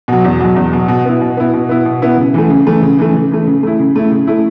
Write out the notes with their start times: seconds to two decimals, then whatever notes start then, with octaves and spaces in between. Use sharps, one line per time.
0.08 B2 F#3
0.24 E2
0.40 B2 F#3
0.56 E2
0.73 B2 F#3
0.88 B2
1.05 B3 E4
1.21 B2
1.37 B3 E4
1.54 B2
1.69 B3 E4
1.85 B2
2.02 B3 E4
2.17 C#3
2.34 E3 A3
2.50 C#3
2.66 E3 A3
2.83 C#3
2.99 E3 A3
3.14 C#3
3.31 E3 A3
3.47 C#3
3.63 A3 E4
3.79 C#3
3.95 A3 E4
4.12 C#3
4.27 A3 E4